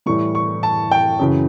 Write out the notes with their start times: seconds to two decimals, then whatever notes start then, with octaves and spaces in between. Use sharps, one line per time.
0.06 A2 E3 G3 C#6
0.35 C#6
0.63 A5
0.91 G5
1.19 F#2 C#3 E3